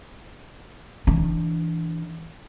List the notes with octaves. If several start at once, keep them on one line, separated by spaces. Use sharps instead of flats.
E3 D4